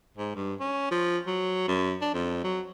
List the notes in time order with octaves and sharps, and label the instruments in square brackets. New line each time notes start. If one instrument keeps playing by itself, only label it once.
[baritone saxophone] G#2
G2
C#4
F3
F#3
F#2
D4
F2
F#3